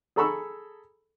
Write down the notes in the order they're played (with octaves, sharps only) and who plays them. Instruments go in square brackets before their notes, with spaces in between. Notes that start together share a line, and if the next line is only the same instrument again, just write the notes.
[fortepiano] G#4 A4 A#5 B5 C#6 E6